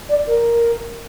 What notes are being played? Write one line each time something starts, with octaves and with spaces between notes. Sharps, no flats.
D5
A#4